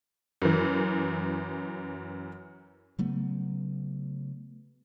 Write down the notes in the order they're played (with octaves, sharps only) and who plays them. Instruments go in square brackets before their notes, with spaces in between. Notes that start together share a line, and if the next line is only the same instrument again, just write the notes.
[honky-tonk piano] F#2 E3
[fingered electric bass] C#3 F#3 A3 B3